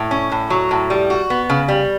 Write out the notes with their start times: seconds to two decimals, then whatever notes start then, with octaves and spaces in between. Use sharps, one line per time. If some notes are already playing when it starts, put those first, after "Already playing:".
Already playing: A2
0.11 C#4
0.31 A2
0.50 F#3
0.71 A2
0.90 G3
1.10 F#4
1.30 B3
1.50 C#3
1.68 G3